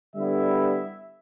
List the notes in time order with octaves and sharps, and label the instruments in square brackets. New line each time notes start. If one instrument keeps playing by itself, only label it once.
[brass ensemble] D3 G3 B3 E4 E5